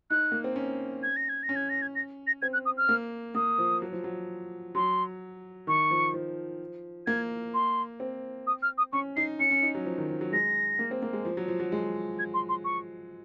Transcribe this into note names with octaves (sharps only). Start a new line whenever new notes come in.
D#4 F#6
A#3
C4
C#4
G#6
A#6
G#6
A#6
C#4
G#6
A#6
G#6
A#6
A#6
C4 G#6
F#6
D#6
F6
A#3
A#3 D#6
F3
F#3
F3
F#3
F#3 C6
D#3 C#6
F3
F3
A#3 G#6
C6
C4
D#6
F6
D#6
C#4 C#6
D#4 C7
C#4 C#7
C#4
D#4
F#3
F3
D#3
F3
F#3
G#3 A#6
A#3
C4
A#3
G#3
F3
F#3
F3
F#3
G#3
G#6
C6
C6
C#6